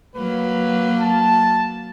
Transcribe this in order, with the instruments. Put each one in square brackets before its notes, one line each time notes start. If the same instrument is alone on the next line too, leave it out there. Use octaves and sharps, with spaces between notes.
[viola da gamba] F#3 A#3 [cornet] B4
[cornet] A5